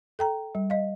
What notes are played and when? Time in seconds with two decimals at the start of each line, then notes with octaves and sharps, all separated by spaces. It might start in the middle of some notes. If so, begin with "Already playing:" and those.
0.19 A4 G5 A#5
0.55 G3
0.70 D#5 F5